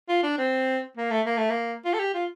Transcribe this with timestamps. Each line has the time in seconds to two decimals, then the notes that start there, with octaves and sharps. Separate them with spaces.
0.09 F4
0.23 D4
0.38 C4
0.97 A#3
1.11 A3
1.26 A#3
1.38 A3
1.50 A#3
1.85 F4
1.94 A4
1.99 G4
2.14 F4